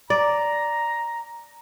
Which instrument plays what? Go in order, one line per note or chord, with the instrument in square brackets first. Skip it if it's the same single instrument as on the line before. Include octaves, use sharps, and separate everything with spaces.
[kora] D5 [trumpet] A#5